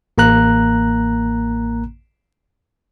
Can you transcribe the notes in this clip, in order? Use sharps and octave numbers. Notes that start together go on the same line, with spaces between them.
A1 A#3 A#5 F#6